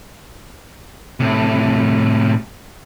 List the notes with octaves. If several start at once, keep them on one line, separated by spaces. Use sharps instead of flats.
A2 C3